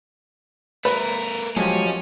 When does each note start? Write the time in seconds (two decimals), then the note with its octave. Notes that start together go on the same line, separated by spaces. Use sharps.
0.85 A3 A#4 B4
1.56 F3 F#3 G#3 C#4 G4